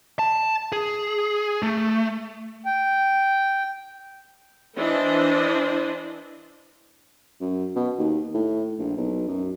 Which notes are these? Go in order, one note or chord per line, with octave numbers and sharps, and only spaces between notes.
A5
G#4
A3
G5
E3 D4 C5 D#5
F#2
B2
D#2
A2
A#1
B1
F#2